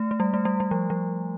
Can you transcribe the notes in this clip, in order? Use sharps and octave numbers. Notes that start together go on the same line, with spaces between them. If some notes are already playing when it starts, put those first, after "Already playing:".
Already playing: A3
A3
G3
A3
G3
G3
F3
F3